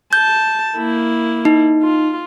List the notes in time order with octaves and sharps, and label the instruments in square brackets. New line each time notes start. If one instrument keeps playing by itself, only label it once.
[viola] A5 [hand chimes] G6
[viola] A#3 E4
[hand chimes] D#4
[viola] F4